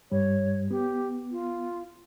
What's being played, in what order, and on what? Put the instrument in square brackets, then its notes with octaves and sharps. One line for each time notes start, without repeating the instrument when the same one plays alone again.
[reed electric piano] G2 G3 [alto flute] C#5
[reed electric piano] B3 [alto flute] G4
[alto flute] F4